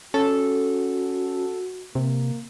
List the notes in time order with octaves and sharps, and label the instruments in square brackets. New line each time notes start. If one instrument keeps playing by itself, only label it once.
[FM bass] C#4 [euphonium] F#4 [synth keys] A4
[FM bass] C3 [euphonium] A#3